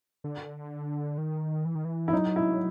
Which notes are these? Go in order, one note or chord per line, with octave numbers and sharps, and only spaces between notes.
D3
D#3
E3
D#3
E3
E4
F#3 D#4
E4